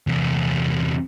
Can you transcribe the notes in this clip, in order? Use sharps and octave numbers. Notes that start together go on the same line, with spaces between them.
E2 C3